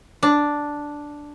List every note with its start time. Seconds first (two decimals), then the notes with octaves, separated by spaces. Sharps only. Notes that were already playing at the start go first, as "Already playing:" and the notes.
0.23 D4